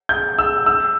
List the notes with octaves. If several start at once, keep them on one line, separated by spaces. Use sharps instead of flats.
G6
E6
E6